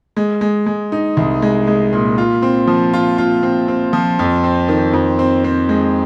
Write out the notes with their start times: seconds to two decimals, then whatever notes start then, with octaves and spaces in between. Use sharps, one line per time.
0.17 G#3
0.41 G#3
0.66 G#3
0.92 D#4
1.17 C2
1.42 G#3
1.67 G#3
1.93 A#2
2.18 F4
2.42 C4
2.67 F3
2.93 F4
3.18 F4
3.43 C4
3.68 C4
3.93 F3
4.19 F2
4.44 C4
4.68 D#3
4.93 F2
5.19 C4
5.44 C4
5.69 G#3